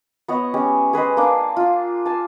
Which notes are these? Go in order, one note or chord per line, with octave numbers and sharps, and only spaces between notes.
B3 C#5 D#5 F#5
G#3 C#4 G4
G#4 B4 C5 D#5
A#3 D4
F4
G#5 A5